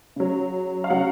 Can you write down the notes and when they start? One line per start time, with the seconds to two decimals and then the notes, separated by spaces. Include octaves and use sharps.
0.16 C#3 F#3
0.84 F5
0.90 C#3 F#3 F#5